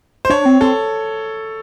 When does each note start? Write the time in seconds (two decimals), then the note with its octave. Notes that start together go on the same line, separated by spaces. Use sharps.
0.25 C5
0.30 D4 C#5
0.45 C4
0.61 C4 A4